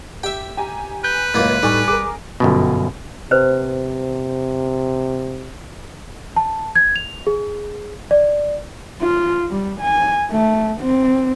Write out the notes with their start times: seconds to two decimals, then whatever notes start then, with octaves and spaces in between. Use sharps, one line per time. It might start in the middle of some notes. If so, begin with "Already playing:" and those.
0.23 G4 E5 G5
0.57 G4 G#5 A#5
1.04 B4 G6
1.34 C#2 F#2 A2 A#3 B3 G#6
1.63 A2 G3 D#4 A4 G#5 C#6
1.88 A1 G#4 A#4 D6
2.40 G1 F#2 B2
3.31 C3 B4 C5
6.36 A5
6.75 G#6
6.96 F7
7.27 G#4
8.11 D5
9.02 F4
9.51 G3
9.81 G#5
10.32 A3
10.81 C4